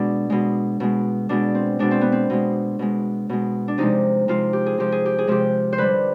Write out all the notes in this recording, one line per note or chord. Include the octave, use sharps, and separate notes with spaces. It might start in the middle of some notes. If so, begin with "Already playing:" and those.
Already playing: B2 G#3 D4
B2 G#3
B2 G#3
B2 G#3 D4
C4
B2 G#3 D4
C4
B3
C4
B2 G#3
B2 G#3
B2 G#3
D4
C3 F3 G#3 D#4
C3 F3 G#3 F4
G4
G#4
C3 F3 G#3 G4
G#4
G4
G#4
C3 F3 G#3 G4
C5
D3 G3 B4